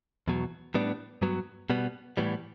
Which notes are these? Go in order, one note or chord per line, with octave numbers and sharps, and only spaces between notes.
E2 B2 F#3
A2 G3 B3 D4
G2 F#3 B3
B2 G3 B3
A2 E3 G3 B3